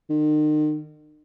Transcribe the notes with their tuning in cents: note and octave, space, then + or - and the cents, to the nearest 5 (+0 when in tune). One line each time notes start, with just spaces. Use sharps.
D#3 -40